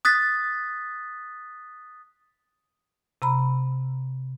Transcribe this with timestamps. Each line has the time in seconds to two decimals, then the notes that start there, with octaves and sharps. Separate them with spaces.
0.05 D#6 F#6 A6 B6
3.22 C3 A#5 B5